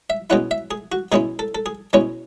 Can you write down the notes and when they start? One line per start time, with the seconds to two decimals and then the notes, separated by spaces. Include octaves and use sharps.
0.10 E5
0.30 B2 G#3 C#4 E4 F#5
0.51 E5
0.71 G#4
0.92 F#4
1.12 B2 G#3 C#4 E4 G#4
1.39 A4
1.55 A4
1.66 G#4
1.93 B2 G#3 C#4 E4 C#5